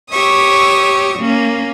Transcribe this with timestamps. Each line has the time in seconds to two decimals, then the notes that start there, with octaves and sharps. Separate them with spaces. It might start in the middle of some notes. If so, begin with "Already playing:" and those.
0.10 G4 C#5 E5 C#6 D#6
1.20 A#3 C#4